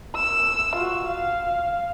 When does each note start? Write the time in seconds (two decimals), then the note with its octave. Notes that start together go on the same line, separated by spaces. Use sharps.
0.15 E6
0.76 F4 F#4
1.06 F5